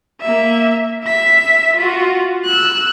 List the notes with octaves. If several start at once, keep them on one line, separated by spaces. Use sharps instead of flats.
A#3 E5
E5 B6
F4 F#4
E6 F#6